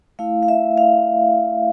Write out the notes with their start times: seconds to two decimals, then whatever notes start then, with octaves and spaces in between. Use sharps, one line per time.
0.19 A3 E4 F5
0.43 F5
0.48 E5
0.78 F5